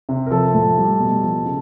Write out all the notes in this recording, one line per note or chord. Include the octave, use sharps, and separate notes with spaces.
C3
A#4
F3 A4
A2
G3
B2
F3
C#3